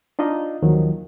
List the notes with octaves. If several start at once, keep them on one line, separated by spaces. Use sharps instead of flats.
D4 D#4 F4 D#5
D#2 D#3 F3 F#3